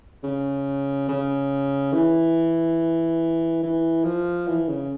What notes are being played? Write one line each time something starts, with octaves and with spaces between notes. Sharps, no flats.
C#3
C#3
E3
E3
F3
E3
C#3